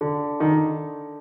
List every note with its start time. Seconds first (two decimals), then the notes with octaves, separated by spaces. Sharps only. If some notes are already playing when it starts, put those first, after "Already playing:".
0.01 D3
0.40 D#3
0.51 D3